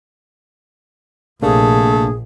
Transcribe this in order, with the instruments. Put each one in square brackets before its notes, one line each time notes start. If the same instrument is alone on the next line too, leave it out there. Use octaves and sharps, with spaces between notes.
[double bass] A#1 [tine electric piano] C3 A#3 D4 [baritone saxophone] A3 [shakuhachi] G#4